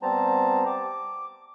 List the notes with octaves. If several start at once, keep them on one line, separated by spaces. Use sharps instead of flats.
G3 B3 C4 C5 A5 A#5
D6